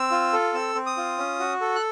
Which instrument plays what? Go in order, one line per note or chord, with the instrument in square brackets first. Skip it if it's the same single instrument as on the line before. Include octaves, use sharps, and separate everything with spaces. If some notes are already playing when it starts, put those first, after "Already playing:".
Already playing: [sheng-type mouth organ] C4 E6
F4
A4
C4 E6
C4
D#6
F4
C#4
F#4
A4
F#6